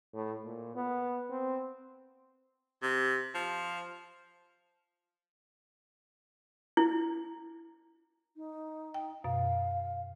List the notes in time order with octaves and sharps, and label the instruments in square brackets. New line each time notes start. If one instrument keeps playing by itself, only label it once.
[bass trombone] A2
A#2
B3
C4
[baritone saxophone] C3
F3
[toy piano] E4
[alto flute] D#4
[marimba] G5
[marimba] F#2 B2 [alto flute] F5